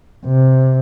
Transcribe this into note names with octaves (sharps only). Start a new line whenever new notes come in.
C3